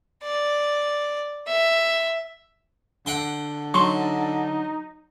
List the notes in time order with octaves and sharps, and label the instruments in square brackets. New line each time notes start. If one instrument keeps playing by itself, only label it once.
[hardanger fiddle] D5
E5
[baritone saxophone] D3 [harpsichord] F#5 G5 C6
[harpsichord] F#3 [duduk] D#4 [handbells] C6 C#6